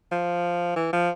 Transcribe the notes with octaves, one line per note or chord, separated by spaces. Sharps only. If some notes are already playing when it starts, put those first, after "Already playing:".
F3
E3
F3